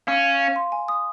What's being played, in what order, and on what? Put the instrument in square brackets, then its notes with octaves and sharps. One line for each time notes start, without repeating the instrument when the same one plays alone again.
[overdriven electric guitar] C#4 [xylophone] F5
[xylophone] F5
F5
C6
G#5
D#6